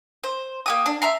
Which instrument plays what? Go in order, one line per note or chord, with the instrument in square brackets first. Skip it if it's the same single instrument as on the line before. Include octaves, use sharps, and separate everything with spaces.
[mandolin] C5
A#3 G4 D#6
D4
E5 A#5 C6